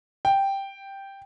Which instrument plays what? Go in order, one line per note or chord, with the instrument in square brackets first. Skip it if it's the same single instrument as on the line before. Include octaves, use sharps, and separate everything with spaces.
[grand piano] G5